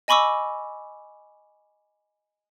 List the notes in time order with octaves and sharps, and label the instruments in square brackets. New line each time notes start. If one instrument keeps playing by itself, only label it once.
[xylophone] D#5 G#5 B5 C#6 D6 E6